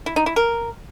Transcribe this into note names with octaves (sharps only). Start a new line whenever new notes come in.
E4
D#4
E4
A#4